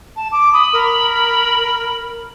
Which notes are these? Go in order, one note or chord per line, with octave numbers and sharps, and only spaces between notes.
A5
D6
B5 D#6
A#4